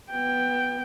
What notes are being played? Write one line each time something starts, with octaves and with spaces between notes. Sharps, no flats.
B3 G5